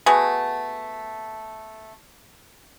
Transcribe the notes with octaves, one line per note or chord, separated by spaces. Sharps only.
A3 B3 F#4 G#4